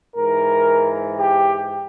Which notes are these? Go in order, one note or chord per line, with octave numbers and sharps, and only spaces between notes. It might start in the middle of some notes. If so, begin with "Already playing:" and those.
G#2 E3 A#4
G4